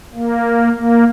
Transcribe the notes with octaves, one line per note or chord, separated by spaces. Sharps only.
A#3
A#3